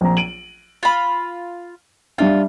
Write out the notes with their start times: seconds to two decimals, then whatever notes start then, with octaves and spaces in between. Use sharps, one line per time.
0.01 A#1 C4 A#5
0.17 D7 D#7 F#7
0.83 F4 B5
2.18 G3 D4 F4 E5